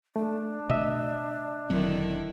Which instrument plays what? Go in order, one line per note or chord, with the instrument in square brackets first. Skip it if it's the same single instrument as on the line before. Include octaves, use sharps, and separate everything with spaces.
[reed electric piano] A3 [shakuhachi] D4
[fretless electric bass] B2 A3 [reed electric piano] D#5 E5
[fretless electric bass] E1 F#3 C4 [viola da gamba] D3 D#3 E4